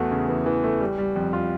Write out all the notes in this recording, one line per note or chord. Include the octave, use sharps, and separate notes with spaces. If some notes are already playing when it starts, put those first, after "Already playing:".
Already playing: E2 A3 F#4
C#3
E3
E3
A3
G3
G3
F2
F4